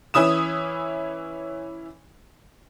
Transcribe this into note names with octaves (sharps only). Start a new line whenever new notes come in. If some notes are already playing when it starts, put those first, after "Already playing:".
E3 C#4 E4 D#6 E7